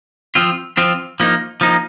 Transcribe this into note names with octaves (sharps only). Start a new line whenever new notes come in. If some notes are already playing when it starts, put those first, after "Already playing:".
F3 C4 F4
F3 C4 F4
F3 A#3 D#4
F3 A#3 D#4